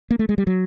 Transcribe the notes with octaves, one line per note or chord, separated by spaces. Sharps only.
A#3
A3
G#3
G3
F#3